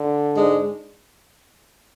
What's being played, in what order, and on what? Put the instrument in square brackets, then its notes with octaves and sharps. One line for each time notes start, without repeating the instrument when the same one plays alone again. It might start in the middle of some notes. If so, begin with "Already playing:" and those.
Already playing: [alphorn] D3
[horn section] G#2 G#3 D4